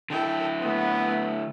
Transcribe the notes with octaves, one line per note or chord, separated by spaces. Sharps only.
D3 E4 A4 G5
A3 B3